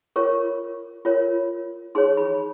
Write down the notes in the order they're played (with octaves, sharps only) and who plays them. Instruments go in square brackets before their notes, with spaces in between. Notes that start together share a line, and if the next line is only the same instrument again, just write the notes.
[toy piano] F4 A#4 C#5 C#6
F4 A#4 C#5
D#4 G#4 C#5 C6
B5